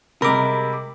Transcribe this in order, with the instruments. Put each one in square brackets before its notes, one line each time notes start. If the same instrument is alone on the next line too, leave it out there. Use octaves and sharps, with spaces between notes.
[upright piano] C3 G3 G#3 [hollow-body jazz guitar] A#4 [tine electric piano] B5 D6